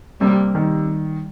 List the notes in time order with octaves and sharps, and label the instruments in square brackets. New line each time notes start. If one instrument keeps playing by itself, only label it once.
[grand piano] C3 [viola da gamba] G3 A#3
[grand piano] D#3